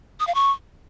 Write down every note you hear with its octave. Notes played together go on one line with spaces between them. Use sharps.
D#6
F5
C#6